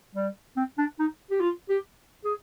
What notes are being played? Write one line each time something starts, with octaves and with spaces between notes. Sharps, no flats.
G3
C4
D4
D#4
G4
F4
G4
G#4